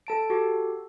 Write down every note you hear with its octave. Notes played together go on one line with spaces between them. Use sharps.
A4 A5 D7
F#4 G4 A4